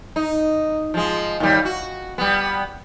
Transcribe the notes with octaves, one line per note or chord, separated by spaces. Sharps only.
D#4
F3 G#3
D#2 G3
F#4
G3 B3